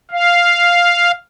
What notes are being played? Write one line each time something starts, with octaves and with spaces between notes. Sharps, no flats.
F5